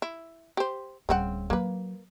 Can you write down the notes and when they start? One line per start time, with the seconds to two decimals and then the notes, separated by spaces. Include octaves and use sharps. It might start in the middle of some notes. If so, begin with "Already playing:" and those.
0.02 E4
0.57 G4 C5
1.09 D1 C#3 G3 C4 F#5
1.50 F#3 A#3 B4